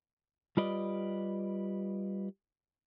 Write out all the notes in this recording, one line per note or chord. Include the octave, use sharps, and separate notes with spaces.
G3 F4 G4 B4 D5 D#5